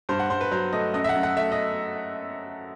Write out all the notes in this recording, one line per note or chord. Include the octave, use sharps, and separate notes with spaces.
G2 C5
F#5
G2 C5
B4
F#3 C5
A3 D#5
F#2 D#5
E5
F#5
F#2
F#5
A3 E5
D#5